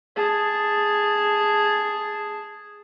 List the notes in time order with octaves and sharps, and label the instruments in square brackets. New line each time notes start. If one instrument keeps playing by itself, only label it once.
[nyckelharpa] G#4 A5